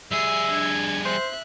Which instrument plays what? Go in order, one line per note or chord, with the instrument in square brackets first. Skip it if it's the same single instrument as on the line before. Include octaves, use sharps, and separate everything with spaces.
[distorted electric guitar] G3 G#4 [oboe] E5 [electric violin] C7
[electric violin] D4 G#6
[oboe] C5 [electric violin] E5 F#6